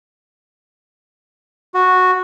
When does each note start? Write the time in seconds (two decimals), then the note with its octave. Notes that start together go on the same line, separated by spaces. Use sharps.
1.74 F#4